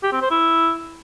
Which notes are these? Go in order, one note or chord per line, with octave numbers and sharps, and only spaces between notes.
G4
C4
C5
E4